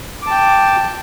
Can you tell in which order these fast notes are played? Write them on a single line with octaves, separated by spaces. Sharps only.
D6 A5 G5